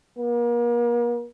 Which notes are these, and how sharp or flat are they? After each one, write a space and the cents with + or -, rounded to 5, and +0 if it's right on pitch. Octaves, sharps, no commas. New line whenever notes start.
A#3 +40